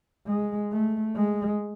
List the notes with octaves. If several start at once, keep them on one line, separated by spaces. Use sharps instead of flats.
G#3
A3
G#3